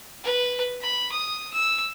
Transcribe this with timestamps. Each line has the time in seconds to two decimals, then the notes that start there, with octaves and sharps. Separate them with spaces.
0.24 B4
0.81 B5
1.12 D#6
1.53 E6